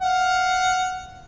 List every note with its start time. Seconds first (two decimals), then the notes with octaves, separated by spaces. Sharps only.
0.02 F5 F#5